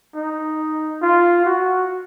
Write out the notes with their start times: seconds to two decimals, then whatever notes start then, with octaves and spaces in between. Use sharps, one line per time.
0.15 D#4
1.02 F4
1.45 F#4